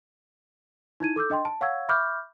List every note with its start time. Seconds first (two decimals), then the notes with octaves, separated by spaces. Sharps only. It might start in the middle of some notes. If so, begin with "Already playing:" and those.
1.00 D#4 E4 G#6 D#7
1.16 A4 D6 E6 G6
1.30 D4 D#5 G5 C6
1.45 A5
1.61 C#5 F5 F#5 C#6 E6 G#6
1.89 E5 B5 C#6 D6 F6 G6